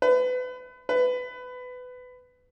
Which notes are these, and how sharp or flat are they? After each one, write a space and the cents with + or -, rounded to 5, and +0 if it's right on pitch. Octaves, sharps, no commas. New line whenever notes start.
B4 +30
B4 +20